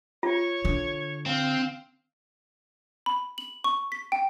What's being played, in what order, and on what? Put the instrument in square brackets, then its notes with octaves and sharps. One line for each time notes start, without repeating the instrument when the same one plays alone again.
[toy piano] F4 [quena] C#5
[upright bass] D3
[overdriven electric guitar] C4 [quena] F5
[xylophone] B5
F#7
C#6
B6
G5